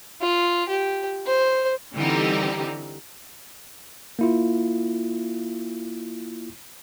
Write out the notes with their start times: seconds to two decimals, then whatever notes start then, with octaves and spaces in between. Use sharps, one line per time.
0.21 F4
0.69 G4
1.26 C5
1.95 D3 E3 G3 C4 D#4 G4
4.19 A#3 E4 F4